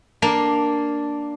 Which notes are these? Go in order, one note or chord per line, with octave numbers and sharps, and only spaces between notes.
A#3 D4